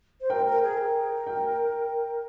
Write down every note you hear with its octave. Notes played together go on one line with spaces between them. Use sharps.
C5
A#4 G5
A#4
G#4
A#4
G5